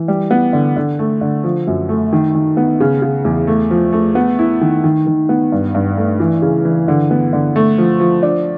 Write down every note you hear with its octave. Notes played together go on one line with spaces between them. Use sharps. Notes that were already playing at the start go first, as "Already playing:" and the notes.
Already playing: E3
G3
B3
D3
D3
A3
D3
F3
F#2
A3
D#3
D#3
B3
C#3
C#3
E2
A3
F3
A3
B3
E4
D#3
D#3
D#3
B3
G2
G2
A3
E3
C#3
E3
D3
B3
D3
A3
F3
F3
D4